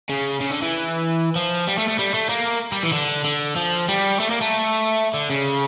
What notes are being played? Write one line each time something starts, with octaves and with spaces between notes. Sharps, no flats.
C#3
C#3
D3
E3
F3
G3
A3
A3
G3
A3
A#3
G3
E3
D3
D3
F3
G3
A3
A#3
A3
D3
C#3